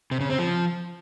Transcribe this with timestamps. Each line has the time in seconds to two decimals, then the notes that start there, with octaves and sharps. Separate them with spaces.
0.11 C3
0.20 C#3
0.30 C4
0.39 F3